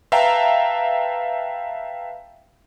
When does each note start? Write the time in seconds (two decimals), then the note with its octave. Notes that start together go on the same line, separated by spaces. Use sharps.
0.12 B4 E5 F5 G5 A5 A#5